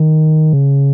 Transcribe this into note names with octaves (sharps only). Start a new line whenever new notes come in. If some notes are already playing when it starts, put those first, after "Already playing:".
Already playing: D#3
C#3